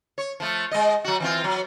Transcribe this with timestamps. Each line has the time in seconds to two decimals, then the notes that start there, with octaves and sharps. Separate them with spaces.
0.18 C#5
0.40 F3 A3
0.71 G#3 D#5
1.04 F#3 F#4
1.20 E3 C4 F4
1.44 F#3